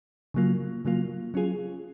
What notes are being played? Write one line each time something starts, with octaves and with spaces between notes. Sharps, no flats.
C#3 F#3 A#3 F4
C#3 F#3 A#3 F4
F#3 C#4 F4 G#4